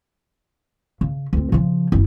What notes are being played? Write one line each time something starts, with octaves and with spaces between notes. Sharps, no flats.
C#3
D2 C4
C#3 F3
F#1 E4